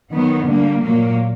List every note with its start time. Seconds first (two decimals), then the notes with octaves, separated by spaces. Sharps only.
0.12 D#3 F#3 B3
0.47 D3 G3 A#3
0.82 A#2 F#3 A#3